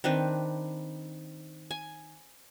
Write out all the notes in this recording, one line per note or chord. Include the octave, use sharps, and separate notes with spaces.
D#3 C4 D4 B4
G#5